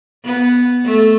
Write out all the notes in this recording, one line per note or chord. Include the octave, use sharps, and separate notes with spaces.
B3
A3